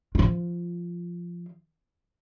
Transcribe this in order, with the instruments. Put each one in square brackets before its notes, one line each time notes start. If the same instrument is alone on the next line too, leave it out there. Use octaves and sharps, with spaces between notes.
[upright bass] F3 F4